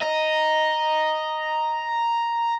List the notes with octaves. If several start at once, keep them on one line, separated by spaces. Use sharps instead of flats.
D#5 A#5